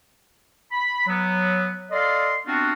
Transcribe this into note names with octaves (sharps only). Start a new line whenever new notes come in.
B5
F#3 B3
A4 D5 D#5 F5 C6
B3 C4 D4 F4 F#4